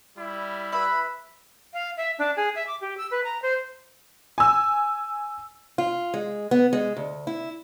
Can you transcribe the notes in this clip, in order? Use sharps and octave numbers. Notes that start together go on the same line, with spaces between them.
G3 E4
B4 E5 B5
F5
E5
D4
G#4
E5
D6
G4
E6
B4
A#5
C5
G#5 E6
F4
G#3
B3
G#3
D2
E4